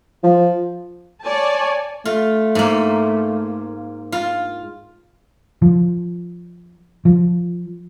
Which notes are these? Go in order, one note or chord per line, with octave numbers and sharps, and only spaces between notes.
F3
C#5 D5 G#5 A5
A3 F4
G#2 A#3
F4
F3
F3